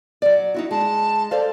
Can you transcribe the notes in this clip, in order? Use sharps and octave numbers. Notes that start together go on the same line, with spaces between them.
F#3 D5
D#4 E4 F#4
G#3 A5
A4 C5 D5 F5